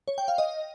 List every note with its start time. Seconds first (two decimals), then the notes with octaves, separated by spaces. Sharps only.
0.08 C#5
0.18 G5
0.28 F5
0.38 D#5